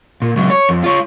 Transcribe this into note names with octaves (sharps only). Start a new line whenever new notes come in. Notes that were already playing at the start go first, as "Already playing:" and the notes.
A#2
C#2 F#3
C#5
F2
F4 C#5